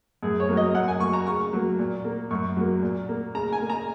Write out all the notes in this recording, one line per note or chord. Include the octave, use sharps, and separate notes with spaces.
F#2 G#4
C#5
F#3 A#3
D#5
F#2 F#5
G#5
F#3 A#3 C#6
A#5
C#3 C#6
F#3 A#3
A#2
A#3
F#2 C#6
F#3 A#3
A#2
A#3
C#3 A#5
G#5
A#3
A#5